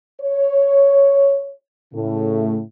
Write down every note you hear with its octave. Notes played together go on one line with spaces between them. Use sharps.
C#5
A2 C#3 A3